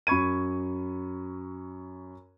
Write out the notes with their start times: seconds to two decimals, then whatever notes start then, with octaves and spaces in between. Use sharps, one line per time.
0.07 F#2 B5 C#6 G#6 D#7